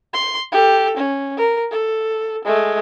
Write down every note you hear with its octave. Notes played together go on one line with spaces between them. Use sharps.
C6
G4 A4
C#4
A#4
A4
G#3 A3